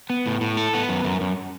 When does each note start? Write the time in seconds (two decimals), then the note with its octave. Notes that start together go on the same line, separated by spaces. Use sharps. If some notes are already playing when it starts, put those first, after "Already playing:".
0.10 B3
0.26 A2
0.41 A2
0.57 A4
0.74 B3
0.89 F#2
1.04 F#2
1.21 F#2